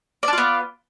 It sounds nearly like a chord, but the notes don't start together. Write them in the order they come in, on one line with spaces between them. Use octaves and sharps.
D5 D4 F4 B3